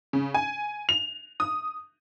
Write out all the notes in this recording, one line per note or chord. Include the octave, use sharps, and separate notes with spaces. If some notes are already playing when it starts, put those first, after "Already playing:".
C#3
G#5
F7
D#6